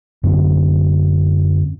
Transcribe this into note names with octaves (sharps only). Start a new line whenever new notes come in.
F#2 D3 C4